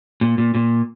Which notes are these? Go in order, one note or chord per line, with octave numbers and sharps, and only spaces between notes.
A#2
A#2
A#2